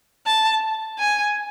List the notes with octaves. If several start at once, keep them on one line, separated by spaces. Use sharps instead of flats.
A5
G#5